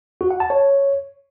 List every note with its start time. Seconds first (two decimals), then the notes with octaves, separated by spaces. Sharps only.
0.21 F#4
0.31 F#5
0.40 A5
0.50 C#5